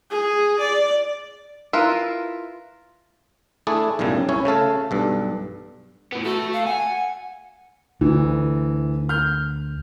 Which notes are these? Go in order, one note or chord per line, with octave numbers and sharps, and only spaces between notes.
G#4
D5
E4 F4 A#4 B4 E5
A3 D4 E4 G#4 D5
B1 F#2 A2 C#3 G3
C2 C#4 E4 C#5
C#3 A3 A4 F5
B1 G2 A4
A2 B3
A3 F#4 A4
F5
F#5 G#5
D2 E3
F6 G6